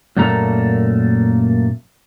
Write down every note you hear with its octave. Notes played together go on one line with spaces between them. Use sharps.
F#2 A#2 A3 A#3 A4 A#5